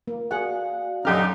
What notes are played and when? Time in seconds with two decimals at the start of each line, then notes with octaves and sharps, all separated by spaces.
0.07 A#3
0.31 F#4 G#4 D5 F5 F#5
1.05 F#2 D3 C#4 D#4 G4 F6